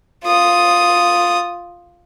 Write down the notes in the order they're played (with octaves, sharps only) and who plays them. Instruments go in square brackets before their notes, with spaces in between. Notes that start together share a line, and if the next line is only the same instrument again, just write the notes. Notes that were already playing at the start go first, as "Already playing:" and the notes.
[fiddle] F4 D#6